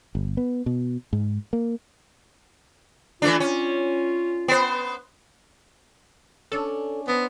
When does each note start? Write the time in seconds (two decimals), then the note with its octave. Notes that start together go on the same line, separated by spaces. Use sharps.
0.15 G1
0.37 B3
0.66 B2
1.13 G#2
1.53 A#3
3.22 E3 A3 D4 F4
3.40 C#4
4.48 B3 C5
6.52 C#4 D4 A4
7.08 B3 C4 A#5